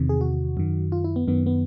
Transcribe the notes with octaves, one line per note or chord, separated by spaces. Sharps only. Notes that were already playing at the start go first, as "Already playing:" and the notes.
Already playing: E2 C3 D#3
G#4
F#4
F#2 D#3
F4
E4
B3
F#2 D#3 B3
B3